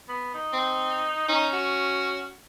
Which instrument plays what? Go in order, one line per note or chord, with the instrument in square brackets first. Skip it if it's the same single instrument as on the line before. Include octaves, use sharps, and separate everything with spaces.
[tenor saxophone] B3
D#4
[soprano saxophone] C4
[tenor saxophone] C#4 [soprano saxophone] D#4
[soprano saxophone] F#4